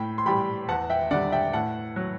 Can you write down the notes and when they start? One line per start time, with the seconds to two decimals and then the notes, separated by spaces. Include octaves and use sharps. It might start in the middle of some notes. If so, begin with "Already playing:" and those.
Already playing: A2 G5 B5
0.18 C6
0.26 E3 G3 G5 B5
0.68 E2 F#5 A5
0.90 E5 G5
1.11 D3 G3 D5 F#5
1.32 E5 G5
1.53 A2 F#5 A5
1.96 F#3